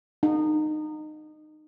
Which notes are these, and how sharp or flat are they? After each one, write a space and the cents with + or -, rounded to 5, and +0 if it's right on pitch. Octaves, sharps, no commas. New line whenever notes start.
D#4 -20